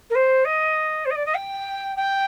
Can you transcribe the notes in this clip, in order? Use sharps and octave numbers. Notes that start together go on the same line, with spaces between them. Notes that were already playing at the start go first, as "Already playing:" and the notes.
A#4
C5
D#5
C5
D#5
D5
D#5
G5
G5